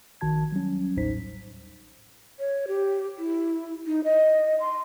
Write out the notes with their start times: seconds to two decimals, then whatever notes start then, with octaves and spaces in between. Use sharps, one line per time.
0.21 A#1 D#3 F#4 A5 G#6
0.52 F#3 G3 C#4
0.97 A1 D#2 A2 D#4 C5 B6
2.39 C#5
2.68 G4
3.18 E4
3.87 D#4
4.04 D#5
4.60 C6